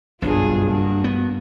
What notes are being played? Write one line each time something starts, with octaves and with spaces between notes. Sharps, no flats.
F#1 B1 G2 D4 F4 G#4
A#3 F#4
B3